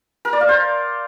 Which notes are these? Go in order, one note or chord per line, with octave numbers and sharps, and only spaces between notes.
A#4
D5
F5
C5